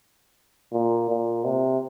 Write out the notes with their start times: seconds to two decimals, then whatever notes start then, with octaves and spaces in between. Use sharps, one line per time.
0.72 A#2
1.10 A#2
1.45 C3